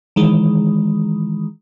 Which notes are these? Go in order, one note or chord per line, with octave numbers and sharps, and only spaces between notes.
D#3 E3 G#3